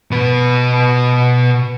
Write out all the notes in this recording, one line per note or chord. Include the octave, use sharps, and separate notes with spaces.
B2 B4